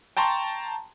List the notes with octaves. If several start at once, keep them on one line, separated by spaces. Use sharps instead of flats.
G5 A5 A#5 C6 C#6